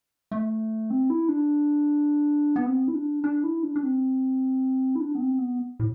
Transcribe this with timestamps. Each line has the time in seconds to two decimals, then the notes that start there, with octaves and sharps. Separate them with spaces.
0.31 A3
0.90 C4
1.10 E4
1.29 D4
2.56 B3
2.66 C4
2.88 E4
2.94 D4
3.24 D4
3.44 E4
3.63 D4
3.76 D4
3.83 C4
4.95 E4
5.00 D4
5.15 B3
5.20 C4
5.39 B3
5.80 A2